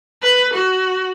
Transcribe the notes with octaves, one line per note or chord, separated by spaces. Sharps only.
B4
F#4